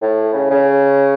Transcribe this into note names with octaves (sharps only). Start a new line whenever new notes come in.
A2
C#3
C#3